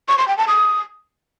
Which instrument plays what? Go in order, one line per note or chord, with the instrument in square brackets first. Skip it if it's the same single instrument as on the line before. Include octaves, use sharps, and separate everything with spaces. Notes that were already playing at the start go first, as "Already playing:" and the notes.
[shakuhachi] C#6
C6
G5
A5
D#6